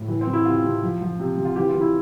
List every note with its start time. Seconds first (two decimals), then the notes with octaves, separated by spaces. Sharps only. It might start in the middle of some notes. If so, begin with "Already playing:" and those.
Already playing: A2
0.08 E3
0.21 C4
0.27 E3
0.33 E4
0.45 C3 F4
0.64 C3
0.83 F3
1.01 F3
1.20 C3
1.37 C3
1.45 F4
1.56 E3 G4
1.69 F4
1.75 E3
1.81 E4